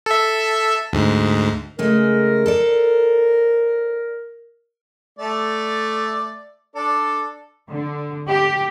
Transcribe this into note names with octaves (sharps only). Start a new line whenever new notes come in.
A4 E5
D2 G#2
C#3 G#3 A3 A#4
A4 C5 D5
A3 D5
D4 A4 D5
D3
G4